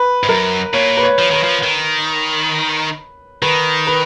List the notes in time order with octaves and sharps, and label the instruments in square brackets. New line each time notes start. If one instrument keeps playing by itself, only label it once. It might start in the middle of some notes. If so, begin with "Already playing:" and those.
Already playing: [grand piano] B4
[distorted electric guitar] G#2
[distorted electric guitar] F#2 [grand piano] A#4
[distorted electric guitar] A#2 [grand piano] C#5
[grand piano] B4
C#5
[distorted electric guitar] F3
[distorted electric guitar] D#3 [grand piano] B4
[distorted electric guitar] F3
D#3
[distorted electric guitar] D#3 [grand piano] B4
[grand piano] B4